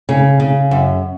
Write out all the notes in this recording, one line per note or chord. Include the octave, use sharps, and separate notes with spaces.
C#3
C#3
F#2